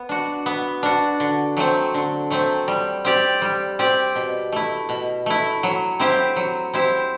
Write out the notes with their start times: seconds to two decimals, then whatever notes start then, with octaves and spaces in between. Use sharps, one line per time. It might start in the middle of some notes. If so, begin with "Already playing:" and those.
Already playing: B3
0.09 D4 F#4
0.46 B3
0.83 D4 F#4
1.20 D3
1.57 F#3 A3 C4
1.94 D3
2.30 F#3 A3 C4
2.68 G3
3.05 C4 G4 D5
3.42 G3
3.79 C4 G4 D5
4.15 B2
4.52 A3 E4
4.89 B2
5.26 A3 E4
5.63 F#3
6.00 C4 E4 G4 C5
6.36 F#3
6.73 C4 E4 G4 C5